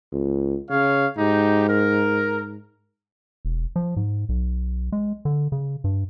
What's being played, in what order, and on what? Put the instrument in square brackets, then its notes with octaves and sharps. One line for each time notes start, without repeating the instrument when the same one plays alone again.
[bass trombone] C#2
[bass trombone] C#3 [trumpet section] C#5 F5
[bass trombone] G#2 [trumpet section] D#4 G4
[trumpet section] A#4
[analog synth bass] E1
F3
G#2
B1
G#3
D3
C#3
G2